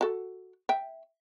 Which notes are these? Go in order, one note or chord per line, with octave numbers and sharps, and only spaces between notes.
F#4 A4
E5 G5